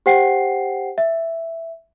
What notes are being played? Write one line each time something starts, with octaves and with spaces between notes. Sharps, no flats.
G4 C5 F#5 G5 C7
E5